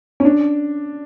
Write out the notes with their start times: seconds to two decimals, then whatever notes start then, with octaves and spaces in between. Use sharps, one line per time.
0.20 C#4
0.25 D4